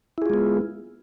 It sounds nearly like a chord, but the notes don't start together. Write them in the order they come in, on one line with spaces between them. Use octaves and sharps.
E4 G#4 F4 G#3 B3